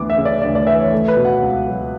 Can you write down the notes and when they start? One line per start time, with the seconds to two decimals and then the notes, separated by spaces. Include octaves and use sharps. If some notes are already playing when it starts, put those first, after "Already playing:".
Already playing: D2 E3 B3 D6
0.10 E5
0.18 C#3
0.25 D5
0.42 D2 D5
0.55 D5
0.67 E3 E5
0.80 C#5
0.92 A3
1.08 B4
1.17 B2
1.25 F#5
1.43 C#2
1.67 F#3